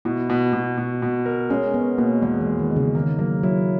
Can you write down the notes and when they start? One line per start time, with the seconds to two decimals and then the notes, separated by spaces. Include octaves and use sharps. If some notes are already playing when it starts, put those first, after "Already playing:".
0.05 B2 E4
0.30 B2
0.53 B2
0.78 B2
1.02 B2
1.26 A#4
1.50 G#3 C#4
1.74 B3 C#4
1.98 B2 A#3
2.22 E2 G#3
2.41 E3
2.46 G#3
2.59 D#3
2.71 G#3
2.76 C#3
2.95 D#3 A#3
3.19 F#3 A#3
3.43 F#3 E4